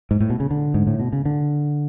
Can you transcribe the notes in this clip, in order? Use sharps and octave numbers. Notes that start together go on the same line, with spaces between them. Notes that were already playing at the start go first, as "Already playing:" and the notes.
G#2
A2
B2
C#3
D3
G#2
A2
B2
C#3
D3